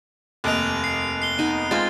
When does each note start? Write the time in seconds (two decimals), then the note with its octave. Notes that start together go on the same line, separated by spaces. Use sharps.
0.44 F1 D#2 D#5 F#6 D7 F7
0.84 C7
1.22 C7 G7
1.39 B3 D#4 D#7
1.71 G#3 C4 F4 G#6 A6